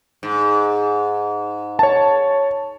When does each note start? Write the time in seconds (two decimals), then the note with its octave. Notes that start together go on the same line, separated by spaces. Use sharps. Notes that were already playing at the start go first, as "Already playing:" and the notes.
0.23 G#2
1.79 C#5 A5